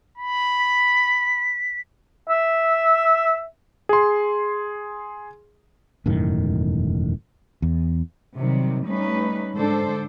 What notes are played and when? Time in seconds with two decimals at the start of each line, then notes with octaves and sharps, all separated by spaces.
0.18 B5
0.59 B6
2.29 E5
3.89 G#4 C6
6.06 E1 F#2 A2 D#3
7.62 E2
8.36 C3 D#3 F#3 G3
8.87 G3 A3 C#4 D#4 B4
9.53 G#2 D3 D4 A4 C5